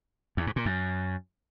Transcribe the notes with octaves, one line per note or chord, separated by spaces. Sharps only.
E2
G#2
A#2
F#2